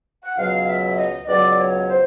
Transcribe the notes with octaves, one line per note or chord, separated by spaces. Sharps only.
F#5
C#2 B2 F#3 F5
E5
D#5
C#2 B2 F#3 D5
C#5
C5